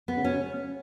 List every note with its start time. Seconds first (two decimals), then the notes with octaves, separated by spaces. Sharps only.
0.08 B3
0.16 C#3
0.24 B2 C#4
0.32 C#3